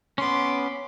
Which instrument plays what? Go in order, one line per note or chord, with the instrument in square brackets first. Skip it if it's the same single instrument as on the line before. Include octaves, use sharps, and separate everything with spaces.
[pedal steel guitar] B3 C#4 [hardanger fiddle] C6 D6